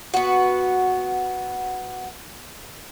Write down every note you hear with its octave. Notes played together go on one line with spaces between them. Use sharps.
B3 F#4